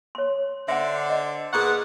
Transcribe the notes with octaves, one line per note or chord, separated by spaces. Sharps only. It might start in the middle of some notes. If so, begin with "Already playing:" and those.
C#5 C6
D3 C5 D5 E5 F#5
D#5
A#2 B3 G#4 F#5 A#5 C#6